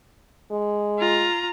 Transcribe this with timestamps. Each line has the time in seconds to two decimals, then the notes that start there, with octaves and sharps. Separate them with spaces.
0.51 G#3
0.99 F4 A#5